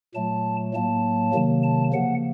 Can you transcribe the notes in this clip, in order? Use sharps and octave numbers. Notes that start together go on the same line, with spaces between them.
A#2 F#3 A3 A5
A2 F#3 A#3 A5
C3 D#3 F#3 A#3
A5
C#3 F3 A#3 F#5